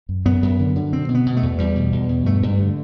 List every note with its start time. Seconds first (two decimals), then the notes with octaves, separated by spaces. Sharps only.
0.09 F#2
0.25 F#2 B3
0.43 F#2
0.59 D3
0.75 D3
0.92 B2 C4
1.09 B2
1.15 B3
1.26 B2
1.37 A3
1.42 E2
1.58 E2 G3
1.76 B2
1.92 E2
2.09 B2
2.26 G2 A3
2.43 G2
2.59 D3